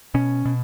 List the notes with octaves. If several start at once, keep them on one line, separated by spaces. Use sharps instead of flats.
B2 C#4
B2